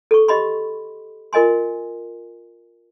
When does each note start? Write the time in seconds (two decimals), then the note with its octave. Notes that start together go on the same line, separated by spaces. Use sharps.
0.11 A4 C#6
0.28 G4 D#5 B5 C6
1.33 F4 A#4 D#5 G#5 C6